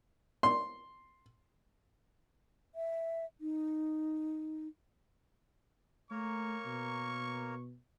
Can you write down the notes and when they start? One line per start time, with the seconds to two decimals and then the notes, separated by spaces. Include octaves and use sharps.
0.43 C6
2.75 E5
3.41 D#4
6.11 A3 A#3 A#4 C#5 C#6
6.66 B2